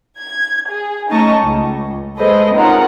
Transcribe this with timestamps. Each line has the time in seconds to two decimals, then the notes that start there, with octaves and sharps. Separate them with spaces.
0.19 G#6
0.69 G#4
1.11 A3 C#4 D#4 D#5 A5 C#6
1.42 C#2
2.17 G#3 G#4 A4 B4 C5 D#5
2.54 C4 C#4 D#4 F4 A#4 F#5